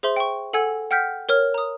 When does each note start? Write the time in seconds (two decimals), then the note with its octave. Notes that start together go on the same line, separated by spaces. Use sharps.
0.03 G#4 C5 E5 C6
0.16 G5 C#6
0.53 A4 F#5 G#5 E6 G#6
0.91 F#5 G5 F6 G6 B6
1.29 A#4 C#5 F6
1.54 A#5 D#6